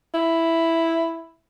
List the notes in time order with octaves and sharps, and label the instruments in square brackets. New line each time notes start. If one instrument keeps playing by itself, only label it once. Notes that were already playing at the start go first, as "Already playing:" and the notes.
[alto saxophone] E4